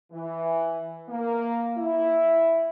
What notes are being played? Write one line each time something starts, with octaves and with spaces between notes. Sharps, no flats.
E3
A#3
E4